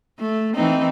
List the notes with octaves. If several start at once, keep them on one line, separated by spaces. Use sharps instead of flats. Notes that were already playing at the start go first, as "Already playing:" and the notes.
A3
E3 C4 D#4